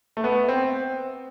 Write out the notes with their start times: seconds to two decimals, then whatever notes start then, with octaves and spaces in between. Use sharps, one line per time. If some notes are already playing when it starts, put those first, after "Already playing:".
0.17 A3
0.24 B3
0.48 C4